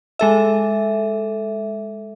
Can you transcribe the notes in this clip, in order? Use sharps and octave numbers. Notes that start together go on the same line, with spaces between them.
G#3 A4 E5